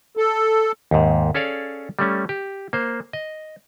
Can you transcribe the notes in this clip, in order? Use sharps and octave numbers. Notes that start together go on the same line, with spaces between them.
A4
D#2 G#2
C#4 G#4 A4 C#5 D5 F5
G3 A3 C#4
G4
A#3 C5
D#5